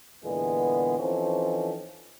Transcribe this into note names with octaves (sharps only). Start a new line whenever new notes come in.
E2 A#2 D3 G#3 B3
E3 F3 C4 C#4 D#4 A4